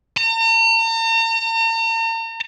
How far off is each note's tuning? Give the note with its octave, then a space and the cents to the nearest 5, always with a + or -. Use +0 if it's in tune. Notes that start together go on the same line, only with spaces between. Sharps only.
A#5 -45